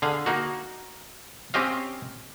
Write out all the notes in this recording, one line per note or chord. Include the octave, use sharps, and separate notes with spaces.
D3 G#4 F5
A#3 D#4 F#4
C4 C#4 G4 D#5 F5